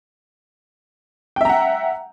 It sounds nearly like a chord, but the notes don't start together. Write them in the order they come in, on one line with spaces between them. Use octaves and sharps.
G5 E5 A#5 F#5